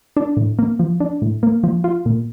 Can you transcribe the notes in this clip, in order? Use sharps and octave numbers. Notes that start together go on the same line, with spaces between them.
D4
A2
A#3
F3
D4
A2
A#3
F3
F4
A#2